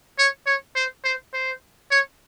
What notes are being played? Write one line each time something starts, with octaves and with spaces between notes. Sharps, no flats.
C#5
C#5
C5
C5
C5
C#5